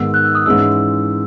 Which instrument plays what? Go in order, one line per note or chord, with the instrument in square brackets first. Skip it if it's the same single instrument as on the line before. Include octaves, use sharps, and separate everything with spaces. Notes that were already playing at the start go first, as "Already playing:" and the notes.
Already playing: [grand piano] G#2 D#3 G#3 B3 [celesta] E6
[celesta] F#6
E6
D#6
[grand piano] G#2 E3 G#3 C#4 E4 [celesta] E6